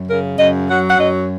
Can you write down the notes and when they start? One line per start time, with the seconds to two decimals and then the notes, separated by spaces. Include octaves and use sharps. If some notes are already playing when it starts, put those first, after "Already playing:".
Already playing: F#2
0.08 C#3 A#4
0.38 F#2 D#5
0.68 F#3 F#5
0.89 F#5
0.98 F#2 D#5